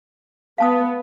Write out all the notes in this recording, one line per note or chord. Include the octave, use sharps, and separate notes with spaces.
B3 F5 A5 D#6